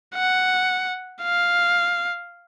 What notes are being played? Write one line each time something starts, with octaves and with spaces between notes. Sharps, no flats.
F#5
F5